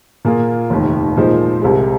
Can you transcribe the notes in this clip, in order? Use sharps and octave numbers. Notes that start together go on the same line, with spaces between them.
A#2 A#3 F4 G#4
F1 D#2 D#3
A#2 F3 G#3 D#4 C5
C2 C3 G#3